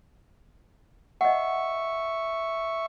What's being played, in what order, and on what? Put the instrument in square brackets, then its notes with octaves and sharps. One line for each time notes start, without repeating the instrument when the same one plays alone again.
[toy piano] D#5 F#5 [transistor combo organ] E5 C#6